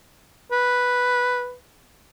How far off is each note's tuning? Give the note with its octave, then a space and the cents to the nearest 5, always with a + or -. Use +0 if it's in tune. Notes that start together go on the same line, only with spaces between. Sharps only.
B4 +0